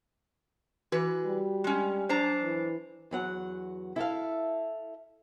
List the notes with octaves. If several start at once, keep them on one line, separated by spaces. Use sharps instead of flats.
E3 F#4 B4
G3
G#3 C#4
F#2 D4 C5 A#5 C7
E3
E2 F#3 F#5
E4 A4 E5 F5